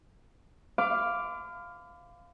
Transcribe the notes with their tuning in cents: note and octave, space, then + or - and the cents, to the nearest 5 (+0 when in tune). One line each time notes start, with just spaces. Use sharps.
F5 +0 B5 +45 D6 +0